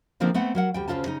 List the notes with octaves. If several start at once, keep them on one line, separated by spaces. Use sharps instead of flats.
D3 F3 A#3 C4 D4 D#4
A3 B3 C4 F#5
F#3 A#4 F#5
D2 G3 G5
D2 G#2 C#3 F4 A4 A5
C#3 D#4